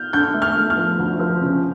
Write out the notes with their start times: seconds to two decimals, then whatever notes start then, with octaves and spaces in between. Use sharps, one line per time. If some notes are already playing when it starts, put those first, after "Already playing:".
Already playing: F6 G6
0.13 D3 G6
0.34 A3
0.42 F6
0.56 A3
0.70 F6
0.77 F3
0.99 D2
1.20 F3
1.41 C#3